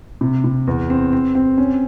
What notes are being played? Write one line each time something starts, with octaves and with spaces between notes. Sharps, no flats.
C3
C3
E2
C4
C4
C4
C#4